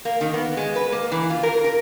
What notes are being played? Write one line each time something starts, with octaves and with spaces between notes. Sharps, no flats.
A#3
D#3
B3
G#3
B4
A#3
E3
F4
A#4
A#4